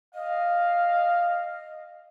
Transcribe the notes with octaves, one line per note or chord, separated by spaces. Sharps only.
D#5 F5